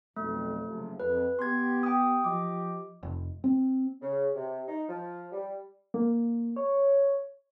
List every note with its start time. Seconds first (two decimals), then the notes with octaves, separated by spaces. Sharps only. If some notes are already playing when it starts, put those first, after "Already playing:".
0.16 B1 F2 A3
0.66 F#1 C3 F3
1.00 F2 B4
1.39 B3 G4 C6 G#6
1.83 G5 D#6
2.24 F3 G4 D#5 D6
3.03 F1
3.44 C4
4.02 C#3
4.35 C3
4.68 D#4
4.89 F3
5.32 G3
5.94 A#3
6.56 C#5